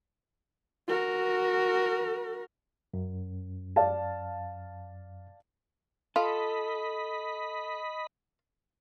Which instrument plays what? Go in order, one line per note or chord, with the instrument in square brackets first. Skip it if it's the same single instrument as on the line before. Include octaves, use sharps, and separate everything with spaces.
[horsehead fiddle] F#4 A#4
[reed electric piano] F#2
[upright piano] D5 F5 A5
[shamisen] F4 [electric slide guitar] A4 [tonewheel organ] D#5 B5